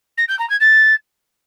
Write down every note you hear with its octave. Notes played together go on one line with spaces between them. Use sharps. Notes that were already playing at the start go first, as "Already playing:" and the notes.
A#6
G6
A#5
G#6
A6